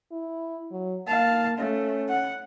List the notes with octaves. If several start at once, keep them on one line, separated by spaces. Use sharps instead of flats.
E4
F#3
A#3 F5 A5
A3 C#4
F#5